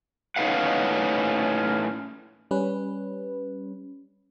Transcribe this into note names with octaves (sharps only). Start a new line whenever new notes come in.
A2 C#4 D#4 B4 F5 F#5
G3 C#4 B4